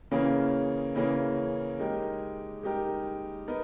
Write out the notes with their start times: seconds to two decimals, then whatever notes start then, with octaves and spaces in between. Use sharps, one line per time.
0.11 C#3 E3 A#3 C#4 G#4
0.95 C#3 E3 A#3 C#4 G#4
1.79 G#3 D#4 G4 A#4
2.63 G#3 D#4 G4 A#4
3.48 B3 D#4 A#4